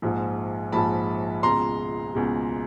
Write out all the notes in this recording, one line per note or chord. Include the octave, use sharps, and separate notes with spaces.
A#1 G#2 F3
A#1 G#2 F3 A5 B5
C#2 B2 G#3 A#5 C6
C#2 B2 G#3